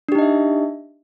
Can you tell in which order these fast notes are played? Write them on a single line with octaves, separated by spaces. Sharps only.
D4 G4 D#4 D#5 E5